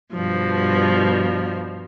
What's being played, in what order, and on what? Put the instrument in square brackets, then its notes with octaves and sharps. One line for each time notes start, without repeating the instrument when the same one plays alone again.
[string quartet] G2 B2 F3